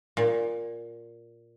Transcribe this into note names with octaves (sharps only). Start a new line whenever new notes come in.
A#2